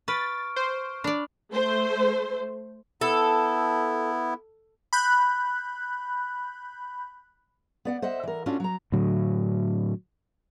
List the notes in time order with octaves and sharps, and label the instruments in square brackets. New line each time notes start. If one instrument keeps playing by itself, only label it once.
[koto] B4 [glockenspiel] C#6 F6 D7 [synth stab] A6
[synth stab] C5
[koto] D4 D5 [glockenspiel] B5
[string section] A3 C5
[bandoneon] B3 E4 [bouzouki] A4
[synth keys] B5 F#6 G6
[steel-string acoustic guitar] B3 D5 F#5
C5 D#5 E5 F#5
E3 A#4
A3 C#4 D4 F4 F#4
F#3 A#5
[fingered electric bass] A2 D3 F#3